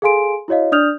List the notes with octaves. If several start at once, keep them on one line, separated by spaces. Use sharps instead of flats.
G#4 A4 F5 G#5 C6 D7
E4 F#4 C#5 D#5 F5
D4 D5 D#6 F6 G6 F7